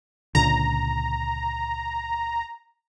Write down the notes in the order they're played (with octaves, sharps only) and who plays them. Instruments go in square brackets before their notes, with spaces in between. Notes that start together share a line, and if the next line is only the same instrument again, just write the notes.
[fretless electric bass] C#2 A#2 D3 [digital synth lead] A#5